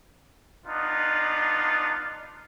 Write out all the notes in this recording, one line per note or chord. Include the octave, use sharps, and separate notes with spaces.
B3 D4 D#4 F4